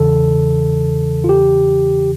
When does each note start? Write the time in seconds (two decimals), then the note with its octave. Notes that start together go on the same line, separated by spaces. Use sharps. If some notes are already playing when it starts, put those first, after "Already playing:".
Already playing: E2 C#3 E3 A4
1.24 F4
1.29 G4